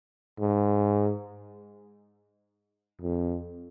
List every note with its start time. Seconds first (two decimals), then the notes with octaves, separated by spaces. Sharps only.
0.39 G#2
3.01 F2